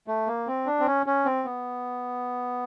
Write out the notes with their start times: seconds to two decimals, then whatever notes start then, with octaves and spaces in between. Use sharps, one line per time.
0.08 A3
0.27 A#3
0.47 C4
0.66 D4
0.80 C4
0.87 C#4
1.06 C#4
1.25 C4
1.45 B3